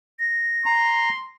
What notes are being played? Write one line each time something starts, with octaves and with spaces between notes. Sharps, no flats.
A#6
A#5 C6